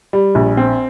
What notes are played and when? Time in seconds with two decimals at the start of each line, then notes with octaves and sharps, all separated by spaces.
0.13 G3
0.35 A#1
0.57 C4